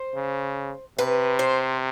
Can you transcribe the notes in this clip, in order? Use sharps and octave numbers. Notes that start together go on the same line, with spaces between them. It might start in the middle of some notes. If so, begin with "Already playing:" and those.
Already playing: C5
C#3
C3 B4
C5